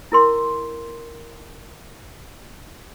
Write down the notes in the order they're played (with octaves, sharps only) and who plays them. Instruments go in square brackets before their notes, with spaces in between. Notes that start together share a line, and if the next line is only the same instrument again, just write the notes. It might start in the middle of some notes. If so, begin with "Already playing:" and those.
[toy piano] E4 A#4 C6